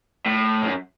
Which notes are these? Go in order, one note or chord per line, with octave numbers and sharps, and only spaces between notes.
A2
F#2